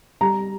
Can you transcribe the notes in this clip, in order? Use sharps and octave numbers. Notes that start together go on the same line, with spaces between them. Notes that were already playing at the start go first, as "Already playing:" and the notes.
G3 A#5